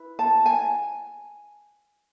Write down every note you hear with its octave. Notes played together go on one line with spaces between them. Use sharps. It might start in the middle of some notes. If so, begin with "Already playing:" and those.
Already playing: E4 B4
A5
G#5